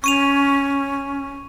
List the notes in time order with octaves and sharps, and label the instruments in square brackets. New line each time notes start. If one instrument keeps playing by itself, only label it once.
[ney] C#4 [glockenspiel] C#6 D#7 F7